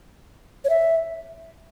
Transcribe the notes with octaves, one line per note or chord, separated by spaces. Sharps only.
C#5
E5